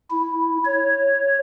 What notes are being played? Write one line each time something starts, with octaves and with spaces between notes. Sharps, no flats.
E4
C#5